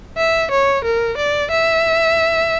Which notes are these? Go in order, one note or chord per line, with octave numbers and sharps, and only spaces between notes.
E5
C#5
A#4
D5
E5